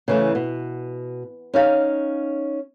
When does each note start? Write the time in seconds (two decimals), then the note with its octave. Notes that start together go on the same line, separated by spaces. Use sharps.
0.08 C#3 E3 A3
0.35 B2
1.54 C#4 D#4 F5